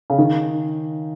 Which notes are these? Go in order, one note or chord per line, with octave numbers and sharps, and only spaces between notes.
C#3
D#3